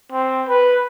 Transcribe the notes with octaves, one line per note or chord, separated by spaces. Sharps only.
C4
B4